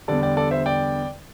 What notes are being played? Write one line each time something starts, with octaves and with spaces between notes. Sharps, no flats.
E2 D3 G3 A4 D5
D5 G5
A4 D5
C5 E5
D5 G5